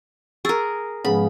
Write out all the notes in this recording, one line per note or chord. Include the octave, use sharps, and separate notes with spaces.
G#4 A#4 C#6 E6 A6
G#2 C#3 F3 G#3 B3 B5